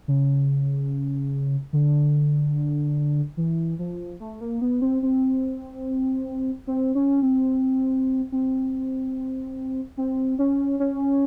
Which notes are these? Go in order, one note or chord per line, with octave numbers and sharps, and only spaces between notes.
C#3
D3
E3
F3
A3
A#3
B3
C4
C4
C4
C#4
C4
C4
C4
C#4
C#4